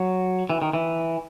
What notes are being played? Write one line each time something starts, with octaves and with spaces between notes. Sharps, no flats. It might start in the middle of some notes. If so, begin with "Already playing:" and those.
Already playing: F#3
E3
D#3
E3